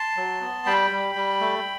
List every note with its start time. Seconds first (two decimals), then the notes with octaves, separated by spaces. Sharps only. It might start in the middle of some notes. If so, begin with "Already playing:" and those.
Already playing: A5 C6
0.17 F#3
0.41 B3
0.66 G3 G5 B5
0.91 G3
1.16 G3
1.40 A3